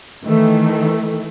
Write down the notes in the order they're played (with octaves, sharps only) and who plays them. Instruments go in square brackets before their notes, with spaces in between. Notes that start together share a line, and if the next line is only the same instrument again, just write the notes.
[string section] D#3 E3 A3